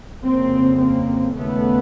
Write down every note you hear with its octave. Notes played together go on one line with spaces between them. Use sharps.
F2 C#3 A#3 C4
A#3 C4
D#2 C#3 A3 B3